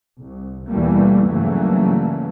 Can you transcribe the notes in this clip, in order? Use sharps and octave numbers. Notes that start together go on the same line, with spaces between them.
C2
D#2 B2 E3 G3 A3 A#3
G2 C#3 E3 F#3 A3 A#3